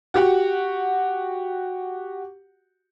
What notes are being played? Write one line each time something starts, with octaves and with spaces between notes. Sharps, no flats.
F#4 G4 F#5